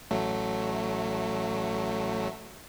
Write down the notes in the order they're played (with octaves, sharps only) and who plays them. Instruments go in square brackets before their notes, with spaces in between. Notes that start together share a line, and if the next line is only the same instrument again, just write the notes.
[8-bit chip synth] A1 F#3 A3